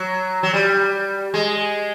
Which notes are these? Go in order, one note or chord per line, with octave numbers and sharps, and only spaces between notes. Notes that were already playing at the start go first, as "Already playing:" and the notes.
Already playing: F#3
F#3
G3
G#3